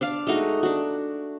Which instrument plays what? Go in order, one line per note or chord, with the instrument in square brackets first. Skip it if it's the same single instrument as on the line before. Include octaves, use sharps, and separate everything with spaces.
[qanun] D4 D5 F5
G#3 A3 D#4 F#4
D4 F#4